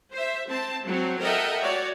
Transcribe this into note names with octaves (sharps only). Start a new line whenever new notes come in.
C5 E5
C4 A5
F#3 C4
A4 A#4 D#5 E5 F#5 G5
F#4 C#5 D5